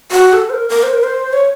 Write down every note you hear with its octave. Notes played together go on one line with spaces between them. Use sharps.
F#4
A4
C5
A#4
A#4
C5
A#4
C5
C#5